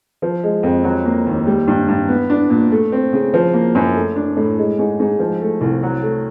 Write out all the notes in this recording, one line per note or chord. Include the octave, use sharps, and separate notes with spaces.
F3
G#3
F2
F#3
A#3
D#2
G3
G2
G2
B3
D4
A#2
A3
C4
C#3
F3
A#3
F#2
A3
D4
A2
G#3
G#2
G#2
F3
A3
C2
F#3
A3